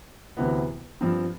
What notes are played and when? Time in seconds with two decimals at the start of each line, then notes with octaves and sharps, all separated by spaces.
0.37 D2 C3 E3 B3
1.01 G2 F3 C4